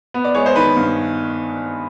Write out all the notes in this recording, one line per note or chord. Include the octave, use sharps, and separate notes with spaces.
B3
D5
G#3 C#5
C5
D#3 B4
G2